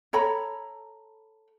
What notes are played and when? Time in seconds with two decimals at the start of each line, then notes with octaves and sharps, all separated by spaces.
0.13 A4 C#5 A#5 B5